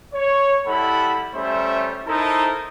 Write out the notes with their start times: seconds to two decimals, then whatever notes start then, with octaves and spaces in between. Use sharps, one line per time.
0.13 C#5
0.66 G3 E4 A4 F#5 B5
1.34 G3 A3 C#4 C5 C#5 E5
2.06 D#4 E4 A4 A#4 C5